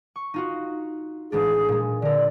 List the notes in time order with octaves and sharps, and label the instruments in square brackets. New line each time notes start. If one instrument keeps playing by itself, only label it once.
[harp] C#6
D#4 F4 F#4
[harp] A1 G#3 D4 [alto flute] G#4
[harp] A#2 G#3
[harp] D3 A#4 [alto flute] D5